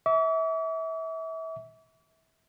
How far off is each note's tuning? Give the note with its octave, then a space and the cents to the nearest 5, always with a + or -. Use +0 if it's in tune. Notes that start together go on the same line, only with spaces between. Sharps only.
E5 -30 D6 -45